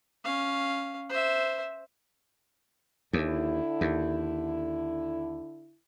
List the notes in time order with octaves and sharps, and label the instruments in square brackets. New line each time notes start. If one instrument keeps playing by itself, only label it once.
[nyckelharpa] C#4 F5
C5 E5
[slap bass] D#2 [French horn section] D3 E4
[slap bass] D#2